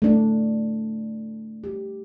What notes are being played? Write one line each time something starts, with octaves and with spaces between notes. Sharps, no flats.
A3 D4
G4